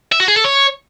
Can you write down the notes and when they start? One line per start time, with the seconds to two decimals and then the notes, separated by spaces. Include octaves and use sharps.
0.12 E5
0.20 F#4
0.28 G#4
0.36 A4
0.44 C#5